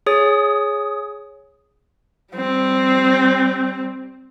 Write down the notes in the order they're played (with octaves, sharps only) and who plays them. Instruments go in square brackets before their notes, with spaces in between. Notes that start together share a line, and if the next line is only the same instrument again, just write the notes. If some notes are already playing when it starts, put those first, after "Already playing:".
[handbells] G#4 C#5 D#6
[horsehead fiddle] G3 C4